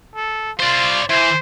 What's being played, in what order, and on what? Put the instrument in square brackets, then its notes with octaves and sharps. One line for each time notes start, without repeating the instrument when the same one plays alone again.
[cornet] A4
[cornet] F4 [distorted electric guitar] C5 D5
[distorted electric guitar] E3 [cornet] C5